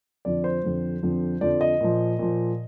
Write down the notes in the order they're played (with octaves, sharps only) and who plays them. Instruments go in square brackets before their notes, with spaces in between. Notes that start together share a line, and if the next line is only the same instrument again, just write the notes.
[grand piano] F2 D3 F3 D5
C5
F2 D3 F3
F2 D3 F3
F2 D3 F3 D5
D#5
A#2 F3
A#2 F3